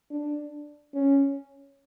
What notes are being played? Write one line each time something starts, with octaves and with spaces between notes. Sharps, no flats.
D4
C#4